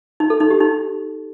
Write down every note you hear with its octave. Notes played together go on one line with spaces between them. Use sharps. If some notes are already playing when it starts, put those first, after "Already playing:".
D#4
A4
D#4
G4
D#4